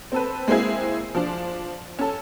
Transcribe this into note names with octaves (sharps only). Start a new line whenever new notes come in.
C4 A4 B4
G#3 A#3 C4 E4 G#4
F3 D4
C#4 A4